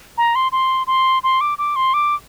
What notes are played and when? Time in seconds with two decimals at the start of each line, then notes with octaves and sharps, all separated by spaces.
0.18 A#5
0.35 C6
0.52 C6
0.87 C6
1.23 C6
1.41 D6
1.58 D6
1.76 C6
1.94 D6